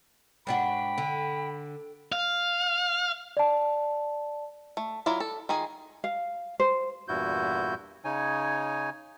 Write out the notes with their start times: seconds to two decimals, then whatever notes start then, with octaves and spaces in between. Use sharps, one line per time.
0.47 G#2 D4 F#4 G5 B5
0.98 D3
2.12 F5
3.37 D5 A5
4.77 A3
5.06 F#3 E4 F4 D5
5.20 A4
5.49 D#3 F4 G#4 G#5
6.04 F5
6.60 C5
7.08 E2 G2 A#2 E4 F#4 G6
8.04 C#3 D#4 C#5 G#5